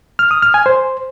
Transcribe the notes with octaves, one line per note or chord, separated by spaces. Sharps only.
F6
D#6
F6
G#5
C5